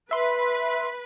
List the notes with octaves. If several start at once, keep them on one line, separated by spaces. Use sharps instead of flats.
B4 E5 C6